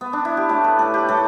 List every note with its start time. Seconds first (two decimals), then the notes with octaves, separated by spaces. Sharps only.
0.01 B3
0.13 D4
0.25 E4
0.37 G4
0.49 A2 A3 A4
0.64 B4
0.79 A2 A3 A4
0.94 G4
1.09 A2 A3 A4